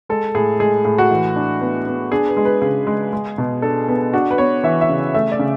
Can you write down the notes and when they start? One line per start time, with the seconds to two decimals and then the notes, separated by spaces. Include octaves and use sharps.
0.09 G#3 A4
0.35 A2 G#4
0.60 G#3 G#4
0.85 A2 G#4
0.98 F#4
1.11 E3
1.36 D4
1.61 B3
1.87 B3
2.12 D4 G#4
2.28 B4
2.37 G#3
2.45 B4
2.62 C#3 G#4
2.87 G#3
3.13 G#3
3.38 B2
3.62 D4 A4
3.88 B3
4.13 D4 F#4
4.31 B4
4.38 B3 C#5
4.64 E3 E5
4.81 E5
4.89 C#3
5.14 A3 E5
5.31 D5
5.39 C#3